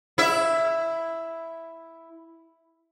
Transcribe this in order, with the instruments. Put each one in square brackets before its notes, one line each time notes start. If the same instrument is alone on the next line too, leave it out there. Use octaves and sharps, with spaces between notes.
[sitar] E4 E5